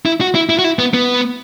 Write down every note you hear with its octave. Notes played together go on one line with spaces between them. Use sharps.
E4
F#4
E4
E4
F#4
E4
B3
B3